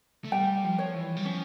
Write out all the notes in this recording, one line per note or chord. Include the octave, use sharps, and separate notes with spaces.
A3
G3 G5
F3
C#5
E3
G3
F3 C#4